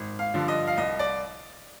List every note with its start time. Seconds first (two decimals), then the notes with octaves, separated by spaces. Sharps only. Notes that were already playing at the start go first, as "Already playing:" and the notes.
Already playing: G#1
0.19 F5
0.34 G2 D3 F3
0.48 D#5
0.67 F5
0.77 C2 D#5
0.99 D5